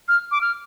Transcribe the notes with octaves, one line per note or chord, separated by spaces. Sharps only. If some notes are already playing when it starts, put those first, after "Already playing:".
F6
D6
F6